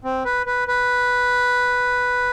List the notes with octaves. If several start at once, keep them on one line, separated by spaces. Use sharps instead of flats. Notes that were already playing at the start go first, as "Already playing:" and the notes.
C4
B4
B4
B4